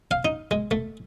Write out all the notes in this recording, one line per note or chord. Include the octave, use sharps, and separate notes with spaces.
F5
D#4
G#3
A3